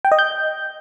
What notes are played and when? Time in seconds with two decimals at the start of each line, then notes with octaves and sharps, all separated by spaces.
0.05 G5
0.12 D#5
0.19 G6